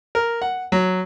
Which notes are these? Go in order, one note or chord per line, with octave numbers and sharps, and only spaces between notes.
A#4
F#5
F#3